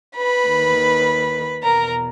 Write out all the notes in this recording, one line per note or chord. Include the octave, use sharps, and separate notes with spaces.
B4 B5
D#2 D#3
E2 B2 A#4 A#5